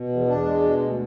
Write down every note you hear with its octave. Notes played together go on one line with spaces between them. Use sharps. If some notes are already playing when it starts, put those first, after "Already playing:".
Already playing: B2
E2
E2 D4
G#3
B2
D2